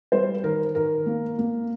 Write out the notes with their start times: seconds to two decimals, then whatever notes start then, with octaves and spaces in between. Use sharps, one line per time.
0.12 G3 C5
0.43 D#3 A#4
0.75 D#3 A#4
1.06 A#3
1.38 A#3